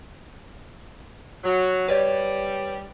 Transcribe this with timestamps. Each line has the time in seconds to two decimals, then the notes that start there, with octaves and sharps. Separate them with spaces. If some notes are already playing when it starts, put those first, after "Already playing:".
1.44 F#3
1.88 G3 B4 C#5 D5